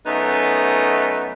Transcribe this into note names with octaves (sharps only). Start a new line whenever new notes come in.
F#2 A3 B3 D#4